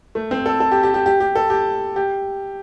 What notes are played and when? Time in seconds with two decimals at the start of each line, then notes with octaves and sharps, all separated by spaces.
0.15 A3
0.31 C4
0.46 A4
0.60 A4
0.71 G4
0.83 G4
0.94 G4
1.06 G4
1.20 G4
1.35 A4
1.50 G4
1.96 G4